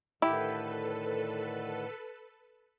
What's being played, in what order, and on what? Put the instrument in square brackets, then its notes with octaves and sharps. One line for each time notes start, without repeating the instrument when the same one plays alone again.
[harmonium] A2 D3 D#3 [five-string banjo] E4 G4 [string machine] A4 B4